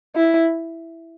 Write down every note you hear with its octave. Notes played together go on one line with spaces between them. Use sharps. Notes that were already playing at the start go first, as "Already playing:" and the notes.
E4